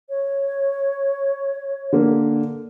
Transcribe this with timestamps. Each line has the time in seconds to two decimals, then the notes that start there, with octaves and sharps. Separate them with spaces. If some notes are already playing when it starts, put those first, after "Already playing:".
0.10 C#5
1.92 D3 A#3